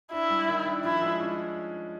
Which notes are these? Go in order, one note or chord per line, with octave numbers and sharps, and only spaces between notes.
D4 E4
G3
D#3
D4
F3 E4
G#3
C#4